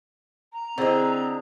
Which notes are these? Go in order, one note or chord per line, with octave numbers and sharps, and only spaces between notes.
A#5
D3 C4 E4 G#4 C5 D#5